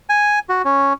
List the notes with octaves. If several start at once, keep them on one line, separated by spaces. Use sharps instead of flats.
G#5
F#4
C#4